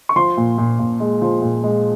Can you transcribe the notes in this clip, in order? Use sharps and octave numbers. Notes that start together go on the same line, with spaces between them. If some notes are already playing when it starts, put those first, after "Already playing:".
C#6
F3 C6
A#2
A#2
A#2
G#3
F3
A#2
G#3